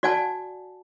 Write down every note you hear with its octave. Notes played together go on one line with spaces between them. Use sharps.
F#4 D5 F#5 G#5 A5